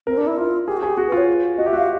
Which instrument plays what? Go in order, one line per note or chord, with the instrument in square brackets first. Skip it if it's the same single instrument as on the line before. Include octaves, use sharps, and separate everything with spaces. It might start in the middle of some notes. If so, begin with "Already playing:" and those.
[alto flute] C4 [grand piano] A#4
[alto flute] D4
[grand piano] A#4
[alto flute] E4
F4
[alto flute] G4 [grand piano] G#4
[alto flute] F#4
[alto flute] G4 [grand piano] G#4
[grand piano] F#4 [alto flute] G#4
[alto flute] B4
[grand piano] F4
[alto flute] C#5
[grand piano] F#4 [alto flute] D#5
[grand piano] G4 [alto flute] E5
[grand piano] F#4 [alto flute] F5